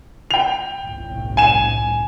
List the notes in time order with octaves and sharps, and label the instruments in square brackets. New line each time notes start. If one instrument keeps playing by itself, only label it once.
[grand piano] G5 F7
[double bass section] G1 C2 A2
[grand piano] G#5 E7